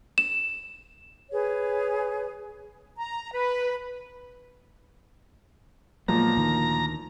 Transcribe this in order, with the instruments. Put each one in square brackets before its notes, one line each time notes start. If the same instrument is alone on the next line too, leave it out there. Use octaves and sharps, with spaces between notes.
[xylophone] E7
[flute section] G#4 B4 C#5
A#5
B4
[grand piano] A#2 F3 [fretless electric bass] F#3 G#3 B3 [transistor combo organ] A#5
[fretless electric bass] D2 D#3